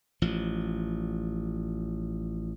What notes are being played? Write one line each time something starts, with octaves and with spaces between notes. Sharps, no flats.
A1 F3